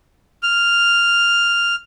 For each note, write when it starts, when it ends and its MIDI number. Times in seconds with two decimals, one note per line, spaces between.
0.43 1.75 89